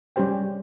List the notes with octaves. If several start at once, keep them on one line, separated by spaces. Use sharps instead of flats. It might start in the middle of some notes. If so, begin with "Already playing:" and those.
G3 C#4 G4 C5 G5